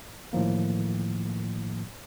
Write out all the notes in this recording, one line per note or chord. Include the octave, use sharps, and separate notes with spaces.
A2 D#3 F3 A#3